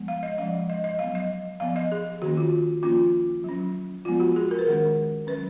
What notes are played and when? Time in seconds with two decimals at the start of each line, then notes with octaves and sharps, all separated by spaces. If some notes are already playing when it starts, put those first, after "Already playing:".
Already playing: F3 G#3 B3
0.08 F5
0.23 D#5
0.38 F3 G#3 C#4 F5
0.70 D#5
0.84 D#5
0.99 F#3 B3 F5
1.15 D#5
1.60 F3 B3 F5
1.76 D#5
1.92 G#4
2.22 D#3 A#3 C#4 F#4
2.37 F4
2.82 F3 A#3 C#4 F4
3.44 F#3 C#4
4.05 F3 G#3 B3 F4
4.20 F#4
4.36 G#4
4.51 A#4
4.59 B4
4.67 D#3 G#3 C#4 A#4
5.27 F#3 C#4 B4